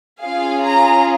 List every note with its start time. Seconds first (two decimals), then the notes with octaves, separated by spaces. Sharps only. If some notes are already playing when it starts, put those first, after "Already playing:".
0.21 C#4 F4 G#4 F5
0.62 A#5